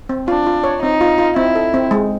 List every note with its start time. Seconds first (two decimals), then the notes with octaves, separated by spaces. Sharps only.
0.09 C4
0.28 D4 F4
0.46 F4
0.64 C#5
0.82 C4 D#4
1.01 F4
1.18 F4
1.36 C4 E4
1.55 A4
1.74 C4
1.91 G#3